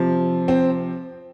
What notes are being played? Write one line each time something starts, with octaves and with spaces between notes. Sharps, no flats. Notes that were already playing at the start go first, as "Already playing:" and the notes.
Already playing: C3 F3
C4